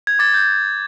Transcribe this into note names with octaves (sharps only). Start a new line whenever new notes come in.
G#6
D6 A6
G6